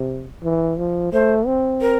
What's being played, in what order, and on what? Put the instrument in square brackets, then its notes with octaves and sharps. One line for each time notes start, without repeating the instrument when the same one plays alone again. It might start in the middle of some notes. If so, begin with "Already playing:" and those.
Already playing: [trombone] C3
E3
F3
[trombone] A3 [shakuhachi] C5
[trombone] C4
[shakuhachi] A#4